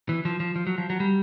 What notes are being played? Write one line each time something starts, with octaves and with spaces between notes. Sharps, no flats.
E3
F3
F3
F3
F#3
F3
F#3
G3